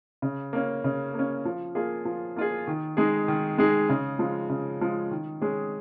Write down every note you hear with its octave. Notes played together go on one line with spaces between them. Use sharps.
C#3
A#3 C#4
C#3
A#3 C#4
F3
A#3 F4 G#4
F3
A#3 F4 G#4
D#3
G#3 D#4 G#4
D#3
G#3 D#4 G#4
C#3
F3 G#3
C#3
F3 G#3
D#3
G#3 C#4 G#4